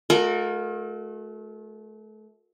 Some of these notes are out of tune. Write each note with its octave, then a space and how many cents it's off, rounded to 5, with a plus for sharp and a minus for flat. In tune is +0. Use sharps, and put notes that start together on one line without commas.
A3 -35 F#4 -45 A#4 +0